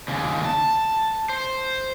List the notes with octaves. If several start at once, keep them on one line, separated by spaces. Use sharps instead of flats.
D#2 C#3
A5
C5